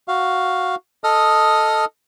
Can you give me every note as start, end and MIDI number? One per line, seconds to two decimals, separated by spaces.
0.08 0.75 66
0.08 0.75 77
1.04 1.85 69
1.04 1.85 75
1.04 1.85 87
1.04 1.85 89